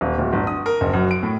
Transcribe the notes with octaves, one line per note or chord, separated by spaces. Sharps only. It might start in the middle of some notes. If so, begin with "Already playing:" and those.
D#1
D1
G1
D#6
A#4
F#1
F#2
D7
A2